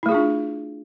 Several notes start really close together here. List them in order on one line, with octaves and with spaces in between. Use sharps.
E4 A3 G#4 F4 D4